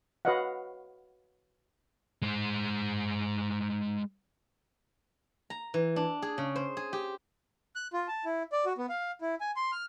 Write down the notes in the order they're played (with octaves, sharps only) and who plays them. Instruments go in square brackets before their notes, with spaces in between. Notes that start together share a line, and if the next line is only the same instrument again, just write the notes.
[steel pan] F#4 B4 C#5 D#5 F5 F#5
[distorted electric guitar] G#3 C5
[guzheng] A#5
E3
D4
G#4
C#3
C5
G#4
G4
[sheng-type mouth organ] F#6
F4
A5
E4
D5
F#4
B3
F5
E4
G#5
C6
F6